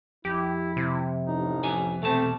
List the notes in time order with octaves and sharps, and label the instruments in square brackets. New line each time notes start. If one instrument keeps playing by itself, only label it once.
[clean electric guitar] F2 [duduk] E4 [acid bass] G4
[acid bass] C3
[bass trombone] A1 [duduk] D#4
[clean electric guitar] F2 B4 G#5
[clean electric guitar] E2 B2 A5 [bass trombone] A3 [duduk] C4